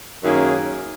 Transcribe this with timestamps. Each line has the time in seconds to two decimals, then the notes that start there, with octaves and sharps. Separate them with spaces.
0.24 F#2 D#3 A#3 C#4 G#4